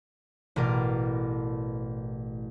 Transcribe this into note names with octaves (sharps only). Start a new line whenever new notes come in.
A1 B2 A#4 D5